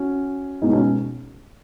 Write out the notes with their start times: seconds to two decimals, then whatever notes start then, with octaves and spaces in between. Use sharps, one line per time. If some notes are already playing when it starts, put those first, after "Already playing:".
Already playing: C#4 F#4
0.62 B2 G#3 D#4 G#4
0.73 C#4 F#4